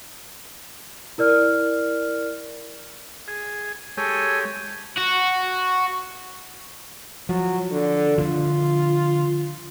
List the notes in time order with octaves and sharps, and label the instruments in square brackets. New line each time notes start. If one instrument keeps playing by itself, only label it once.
[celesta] E4 A#4 D5 F6
[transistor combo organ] G#4
[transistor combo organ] G#3 G4 [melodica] A4 C#5 G#5
[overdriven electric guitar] F#4
[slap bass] F3 [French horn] F#3
[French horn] D3
[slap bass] D3 F3 [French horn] F4